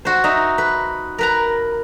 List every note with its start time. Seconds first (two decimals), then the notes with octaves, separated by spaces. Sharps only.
0.05 F#4 C5
0.24 D#4 E5
0.58 B4
1.18 A#4 B4 A#5